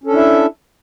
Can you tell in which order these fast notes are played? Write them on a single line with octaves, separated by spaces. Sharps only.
C#4 A4 D4 E4 E5